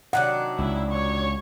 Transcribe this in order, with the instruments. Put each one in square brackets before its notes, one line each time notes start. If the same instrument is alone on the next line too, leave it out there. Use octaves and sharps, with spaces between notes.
[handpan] C3 F#5 [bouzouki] D#3 F#3 D4
[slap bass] C#2 [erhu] E4
[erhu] C#5